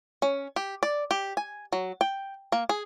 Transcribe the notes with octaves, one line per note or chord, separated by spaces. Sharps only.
C#4
G4
D5
G4
G#5
F#3
G5
A#3
G#4